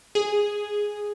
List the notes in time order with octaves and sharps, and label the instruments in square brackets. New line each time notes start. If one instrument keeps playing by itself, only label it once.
[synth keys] G#4